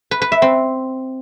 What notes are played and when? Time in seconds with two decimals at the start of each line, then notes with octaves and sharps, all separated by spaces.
0.11 B4
0.22 B4
0.32 E5
0.42 C4